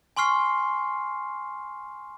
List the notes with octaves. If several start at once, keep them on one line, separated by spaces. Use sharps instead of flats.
G#5 C6 C#6 F6 C7